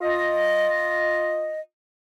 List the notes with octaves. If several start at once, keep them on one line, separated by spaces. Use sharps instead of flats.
F4 D#5